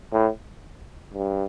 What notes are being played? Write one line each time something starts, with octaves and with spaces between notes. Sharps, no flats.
A2
G2